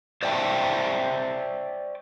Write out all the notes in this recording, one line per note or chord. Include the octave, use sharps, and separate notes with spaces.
C5 D5 E5 G5 A5